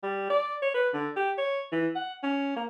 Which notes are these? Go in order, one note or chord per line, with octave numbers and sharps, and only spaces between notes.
G3
D5
C#5
B4
D3
G4
C#5
E3
F#5
C#4
A#3